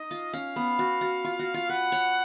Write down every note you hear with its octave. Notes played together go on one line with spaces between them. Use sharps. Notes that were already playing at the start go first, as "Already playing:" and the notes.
Already playing: D#4 D#5
F4
C#4 F5
B3
F#4
F#4
F4
F#4
F4
B4 F#5
C#5